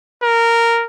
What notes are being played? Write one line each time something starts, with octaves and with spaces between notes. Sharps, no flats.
A#4